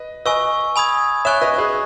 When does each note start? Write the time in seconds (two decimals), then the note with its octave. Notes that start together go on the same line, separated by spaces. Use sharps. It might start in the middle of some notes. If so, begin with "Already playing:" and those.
Already playing: B4 D#5
0.26 B4 D#5 G#5 C#6 E6
0.76 G#5 B5 D#6 G#6
1.25 C#5 E5 G#5 C#6 F#6 A6 E7
1.42 B4 D#5
1.58 G#4 B4